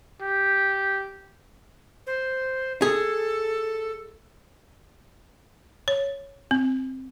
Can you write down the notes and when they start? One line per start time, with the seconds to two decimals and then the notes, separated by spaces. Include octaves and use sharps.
0.22 G4
2.07 C5
2.82 G#4 A4
5.88 C#5
6.51 C4